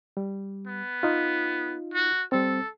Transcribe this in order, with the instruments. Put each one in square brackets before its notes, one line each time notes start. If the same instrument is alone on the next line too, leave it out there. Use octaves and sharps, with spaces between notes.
[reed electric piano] G3
[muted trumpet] B3
[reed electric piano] D#4 F4
[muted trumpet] F#4
[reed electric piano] G3 C4 [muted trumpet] A4